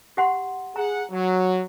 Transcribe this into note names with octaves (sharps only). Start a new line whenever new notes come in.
G4 F#5 C6
G#4 F#5 A#5
F#3